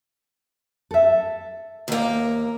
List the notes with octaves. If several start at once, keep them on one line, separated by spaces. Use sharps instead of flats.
A4 E5
D#2 A#3